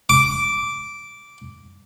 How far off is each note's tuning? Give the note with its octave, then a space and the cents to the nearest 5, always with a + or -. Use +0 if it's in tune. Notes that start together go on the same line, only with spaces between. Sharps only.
D6 -10